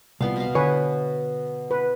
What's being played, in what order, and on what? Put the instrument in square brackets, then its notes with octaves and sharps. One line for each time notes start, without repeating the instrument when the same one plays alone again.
[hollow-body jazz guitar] C2 [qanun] F3 B3 F5
[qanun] B2 F5
[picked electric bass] D3 [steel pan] B4 G#5 [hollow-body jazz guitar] C#5
[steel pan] B4